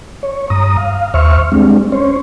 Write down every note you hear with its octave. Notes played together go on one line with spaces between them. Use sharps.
C#5
G2 A#5 D#6
F5
D#2 C5 E5 C#6 F6
G3 G#3 C4 D4
C#4 C5 C#5